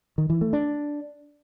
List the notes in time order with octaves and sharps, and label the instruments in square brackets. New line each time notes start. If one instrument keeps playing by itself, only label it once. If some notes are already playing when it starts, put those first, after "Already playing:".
[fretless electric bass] D#3
E3
A3
D4